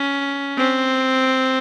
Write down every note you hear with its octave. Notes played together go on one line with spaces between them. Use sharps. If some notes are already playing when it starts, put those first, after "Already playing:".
Already playing: C#4
C4